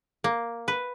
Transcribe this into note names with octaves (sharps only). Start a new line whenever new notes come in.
A#3
B4